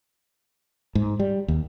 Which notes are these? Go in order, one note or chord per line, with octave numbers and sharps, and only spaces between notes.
G#2
G3
D#2